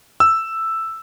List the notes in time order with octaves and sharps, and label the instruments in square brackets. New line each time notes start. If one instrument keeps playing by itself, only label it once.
[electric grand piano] E6